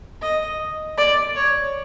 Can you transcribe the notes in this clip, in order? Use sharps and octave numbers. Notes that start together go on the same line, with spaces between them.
D#5
D5
C#5